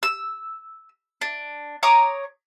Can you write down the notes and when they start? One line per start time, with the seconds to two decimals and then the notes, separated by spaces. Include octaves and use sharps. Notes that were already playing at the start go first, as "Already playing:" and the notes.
0.03 E6
1.21 D4
1.83 C#5 A#5 D6 D#6